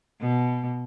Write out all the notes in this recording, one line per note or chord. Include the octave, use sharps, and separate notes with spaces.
B2